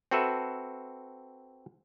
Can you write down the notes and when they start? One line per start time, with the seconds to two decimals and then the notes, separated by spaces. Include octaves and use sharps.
0.11 C4 F#4 A4 B4 E5